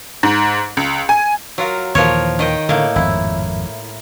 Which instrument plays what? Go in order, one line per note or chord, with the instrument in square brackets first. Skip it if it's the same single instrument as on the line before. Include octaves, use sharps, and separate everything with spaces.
[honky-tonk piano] G#2
C#2
G#5
[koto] F#3 F4 A#4
[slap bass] D#2 A#2 E3 [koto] F3 A#4 C#5
[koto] D#3 D#5 G5
[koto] A2 A#3 [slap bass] D3
[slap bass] G#1 F2 [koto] E4